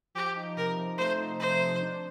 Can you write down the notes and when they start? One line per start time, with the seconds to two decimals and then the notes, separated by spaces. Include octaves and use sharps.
0.15 F3 G4
0.35 D#4
0.57 C3 A#4
0.78 F3
0.98 A3 C5
1.20 D#4
1.40 D#4 C5
1.60 D#4
1.81 D4